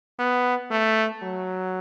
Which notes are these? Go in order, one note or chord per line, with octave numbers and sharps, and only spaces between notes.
B3
A3
F#3